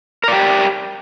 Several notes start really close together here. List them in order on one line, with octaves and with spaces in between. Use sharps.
A#4 D5 G4